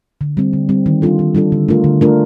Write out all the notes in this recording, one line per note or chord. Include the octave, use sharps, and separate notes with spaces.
D3
G3 C4
D3
G3 C4
D#3
G3 D4 F4 A4
D#3
G3 D4 F4 A4
D3
A3 D4 F4 A#4
D3
A3 D4 F4 A#4